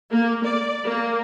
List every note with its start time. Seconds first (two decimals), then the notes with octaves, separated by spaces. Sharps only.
0.11 A#3
0.45 D5
0.84 A#3